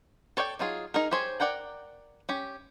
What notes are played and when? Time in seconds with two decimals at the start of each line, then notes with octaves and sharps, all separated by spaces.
0.37 A4 C#5 D5 F#5 G5
0.59 F#3 D#4 F4 G#4
0.94 D#4 G#4 A#4
1.11 G4 G#4 C5 C#5 G#5
1.40 A#4 D5 F#5 G5 A#5
2.29 C#4 G4